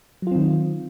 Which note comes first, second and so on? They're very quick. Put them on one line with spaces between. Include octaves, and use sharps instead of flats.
F#3 F4 C4 D#3